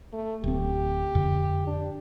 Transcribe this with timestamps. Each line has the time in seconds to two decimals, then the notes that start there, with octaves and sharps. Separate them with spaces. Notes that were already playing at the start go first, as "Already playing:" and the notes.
0.13 A3
0.44 D1 C4 G4
1.15 F2 D3
1.67 D4